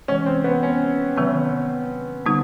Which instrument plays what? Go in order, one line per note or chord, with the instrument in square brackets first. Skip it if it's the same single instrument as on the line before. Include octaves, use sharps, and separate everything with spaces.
[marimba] C3 E3 G#3 [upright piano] C#4
[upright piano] C4
B3
C#4
[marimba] C3 D#3 F#3 B3
D3 G3 B3 D#4